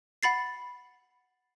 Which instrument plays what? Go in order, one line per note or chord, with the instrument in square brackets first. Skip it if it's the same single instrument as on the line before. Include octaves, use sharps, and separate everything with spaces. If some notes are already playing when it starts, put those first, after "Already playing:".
[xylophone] F#5 B5 A6 C7